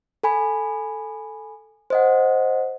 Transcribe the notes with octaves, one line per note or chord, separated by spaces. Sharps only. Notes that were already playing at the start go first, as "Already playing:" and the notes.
A4 G#5 B5
C5 D#5 F#5